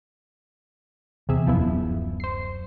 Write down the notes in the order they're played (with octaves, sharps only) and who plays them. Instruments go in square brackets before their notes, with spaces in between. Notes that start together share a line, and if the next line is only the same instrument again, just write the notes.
[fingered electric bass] E2 [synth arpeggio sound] C3 G#4 E5
[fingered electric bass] D1 F#2 [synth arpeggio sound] F3 B3 E4
[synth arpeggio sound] C5 C7